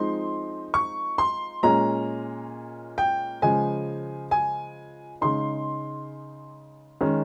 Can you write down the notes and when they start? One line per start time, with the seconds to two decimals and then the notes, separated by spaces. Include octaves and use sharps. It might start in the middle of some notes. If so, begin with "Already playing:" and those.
Already playing: F3 G#3 C4 D#4 C6
0.74 C#6
1.18 C6
1.63 A#2 G#3 C#4 A#5
2.98 G5
3.42 C#3 F3 G#3 G#5
4.31 G#5
5.21 C#3 G#3 D#4 C6
7.01 D#3 G#3 C#4